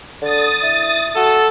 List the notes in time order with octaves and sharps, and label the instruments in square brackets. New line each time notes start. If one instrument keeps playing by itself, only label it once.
[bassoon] D3 [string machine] D#6 A6
[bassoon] E4
[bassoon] F#4 [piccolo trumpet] A4